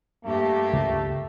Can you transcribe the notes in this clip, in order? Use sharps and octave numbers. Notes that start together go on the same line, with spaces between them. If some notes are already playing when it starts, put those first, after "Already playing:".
G2 A3 A#3 G4
C#2